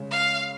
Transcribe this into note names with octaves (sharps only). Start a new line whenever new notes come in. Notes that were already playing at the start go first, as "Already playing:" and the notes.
Already playing: C#3 G#3 C#4
F5